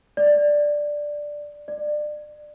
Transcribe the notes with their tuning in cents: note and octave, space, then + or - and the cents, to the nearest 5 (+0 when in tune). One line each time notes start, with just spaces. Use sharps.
D5 +5
D5 +30